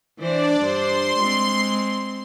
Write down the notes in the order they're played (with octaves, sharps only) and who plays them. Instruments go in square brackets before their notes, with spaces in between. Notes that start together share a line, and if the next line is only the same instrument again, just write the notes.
[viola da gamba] E3 C5 [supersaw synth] D4 D5
[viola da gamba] G2 C5 [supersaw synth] C6
[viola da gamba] G#3 C4